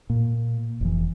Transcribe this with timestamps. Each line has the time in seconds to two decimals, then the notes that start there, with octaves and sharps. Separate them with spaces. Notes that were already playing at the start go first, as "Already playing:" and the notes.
0.10 A#2
0.81 F1 E3